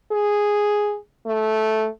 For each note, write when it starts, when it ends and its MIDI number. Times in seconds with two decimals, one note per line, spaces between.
0.12 0.97 68
1.26 1.87 57